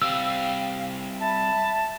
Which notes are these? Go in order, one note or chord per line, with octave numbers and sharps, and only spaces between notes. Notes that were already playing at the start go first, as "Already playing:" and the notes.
G3 C4 F5 G5 E6
E5 A5 B5